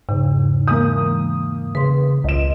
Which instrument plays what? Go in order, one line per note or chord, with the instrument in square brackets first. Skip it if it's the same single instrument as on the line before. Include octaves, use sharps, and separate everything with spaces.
[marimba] E2 C#3 [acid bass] G#2
[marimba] E3 G#3 [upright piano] A#3 D#6
[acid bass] C#3 [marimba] B4 C6
[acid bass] C#2 [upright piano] D#5 E7